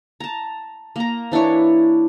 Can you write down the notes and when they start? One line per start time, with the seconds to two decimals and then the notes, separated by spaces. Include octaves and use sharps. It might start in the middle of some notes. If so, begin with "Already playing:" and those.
0.20 A5 A#5
0.96 A#3 A#5
1.32 E3 D4 E4 C#5